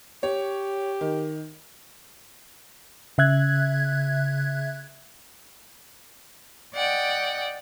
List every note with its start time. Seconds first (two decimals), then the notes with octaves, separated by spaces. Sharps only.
0.23 G4 C#5
1.01 D#3
3.18 C#3 E5 F#6 G#6
6.75 D5 D#5 F#5 G5